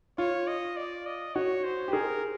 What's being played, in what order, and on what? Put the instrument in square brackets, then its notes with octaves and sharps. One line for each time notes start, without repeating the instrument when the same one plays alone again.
[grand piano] F4 [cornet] C#5
[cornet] D#5
D5
D#5
[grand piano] F#4 [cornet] C#5
[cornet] C5
[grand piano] G4
[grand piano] G#4 [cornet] A#4